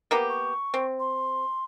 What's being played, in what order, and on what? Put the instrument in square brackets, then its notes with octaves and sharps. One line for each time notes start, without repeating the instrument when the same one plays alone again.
[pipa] A#3 B3 G4
[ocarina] C#6
[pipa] C4
[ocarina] C6